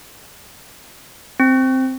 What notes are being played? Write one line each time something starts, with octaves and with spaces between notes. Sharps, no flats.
C4